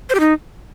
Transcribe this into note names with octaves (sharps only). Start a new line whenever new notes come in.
C5
G4
D#4